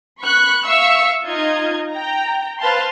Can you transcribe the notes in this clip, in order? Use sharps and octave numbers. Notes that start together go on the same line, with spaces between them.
B5 C#6 F#6
E5 F5 C#6 E6
D#4 F4 D#5 G#6
G5 A#5
B4 C5 F5 A5 C6